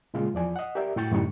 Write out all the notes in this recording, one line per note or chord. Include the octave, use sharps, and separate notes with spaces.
A#2 C#3 G#3 F4
E2 F3 D5 G#5
D#5 F#5
G4 A#4 D5 E5
A2 F#4 G5 C#6 A6
F#2 A2 D3 G3 D#4 C#6